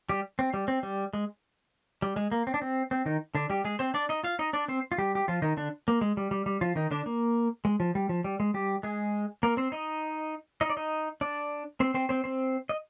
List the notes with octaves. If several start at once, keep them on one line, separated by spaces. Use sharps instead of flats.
G3 G4
C4
G3
C4
G3
G#3
G3
G#3
A#3
C4
D4
C4
C4
D#3 D#4
D3 D4
G3 G4
G#3 G#4
C4 C5
D4 D5
D#4 D#5
F4 F5
D#4 D#5
D4 D5
C4 C5
F4
G3 G4
G4
F3 F4
D#3 D#4
D3 D4
A#3
G#3
G3
G3
G3
F3 F4
D#3 D#4
D3 D4
A#3
G#3
F3
G3
F3
G3
G#3
G3 G4
G#3 G#4
A#3 A#4
C4 C5
D#4 D#5
D#4 D#5
D5
D#4 D#5
D4 D5
C4 C5
C4 C5
C4 C5
C4 C5
D#5